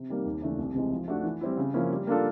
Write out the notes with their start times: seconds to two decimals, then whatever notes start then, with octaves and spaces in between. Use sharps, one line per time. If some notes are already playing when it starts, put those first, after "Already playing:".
Already playing: C3
0.09 D#3 G3 A#3
0.25 D#2
0.42 C#3 E3 A3 D4
0.58 C2
0.75 C3 E3 G#3
0.91 F3
1.08 A3 D4 F#4
1.24 E3
1.41 G3 C4 E4
1.57 C#3
1.74 F3 A#3 C#4 E4
1.91 G3
2.07 A#3 D4 F4 A4